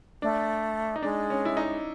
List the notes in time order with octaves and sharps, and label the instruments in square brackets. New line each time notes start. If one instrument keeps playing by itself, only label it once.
[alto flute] A3 [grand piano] D4
[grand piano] D#4
[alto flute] G#3 [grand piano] D4
[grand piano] C#4
E4
D#4